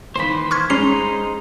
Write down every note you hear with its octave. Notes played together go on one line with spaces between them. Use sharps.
D#3 E3 A#3 C5 B5
C#6 F6 G#6
G#3 C#4 D#4 C5 A#5 C7